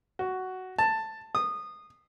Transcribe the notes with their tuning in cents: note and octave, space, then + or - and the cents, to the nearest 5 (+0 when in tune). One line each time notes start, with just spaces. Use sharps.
F#4 +10
A5 +10
D#6 -20